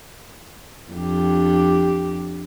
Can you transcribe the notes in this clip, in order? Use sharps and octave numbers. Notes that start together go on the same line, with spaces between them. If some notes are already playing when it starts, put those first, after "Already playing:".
F2 D4 G4